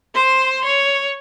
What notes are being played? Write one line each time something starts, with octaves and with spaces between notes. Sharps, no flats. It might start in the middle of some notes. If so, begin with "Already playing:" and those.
C5 C6
C#5